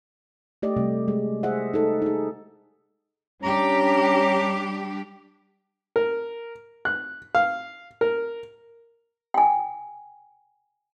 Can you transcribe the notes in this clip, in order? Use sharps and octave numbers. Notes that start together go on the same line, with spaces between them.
A3 G4 D5 D#5
C3 G3 A3
G#3
E4 G#4 C5 D#5 E5 F#5
D#4 A4
D#4 G#4
G3 C#4 D4 G4 A#5
A#4
F#6
F5
A#4
G5 G#5